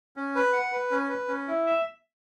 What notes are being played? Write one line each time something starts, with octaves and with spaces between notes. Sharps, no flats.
C#4
B4
F#5
B4
C#4
B4
C#4
E4
E5